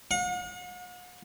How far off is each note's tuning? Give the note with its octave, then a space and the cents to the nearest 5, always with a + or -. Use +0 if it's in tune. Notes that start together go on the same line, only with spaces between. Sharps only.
F#5 -45